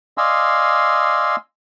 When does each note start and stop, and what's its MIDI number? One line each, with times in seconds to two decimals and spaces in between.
0.18 1.36 74
0.18 1.36 75
0.18 1.36 77
0.18 1.36 80
0.18 1.36 84
0.18 1.36 88